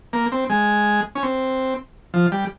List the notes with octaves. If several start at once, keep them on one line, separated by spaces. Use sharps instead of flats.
A#3
C4
G#3
C#4
C4
F3
G3